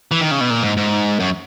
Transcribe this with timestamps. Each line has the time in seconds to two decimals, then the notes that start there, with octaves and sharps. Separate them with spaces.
0.11 E3
0.21 D#3
0.31 C#3
0.41 B2
0.50 A#2
0.63 G#2
0.77 G#2
1.20 F#2